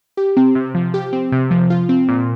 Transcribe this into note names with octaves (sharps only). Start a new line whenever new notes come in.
G4
C4
C3
F3
G4
C4
C3
F3
F4
C4
A#2